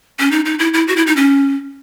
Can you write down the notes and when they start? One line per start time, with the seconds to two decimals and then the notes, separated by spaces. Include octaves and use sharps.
0.19 C#4
0.31 D#4
0.45 D#4
0.59 E4
0.74 E4
0.88 F#4
0.96 E4
1.07 D#4
1.16 C#4